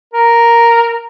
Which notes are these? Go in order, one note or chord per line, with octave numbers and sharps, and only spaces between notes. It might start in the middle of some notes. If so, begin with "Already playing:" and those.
A#4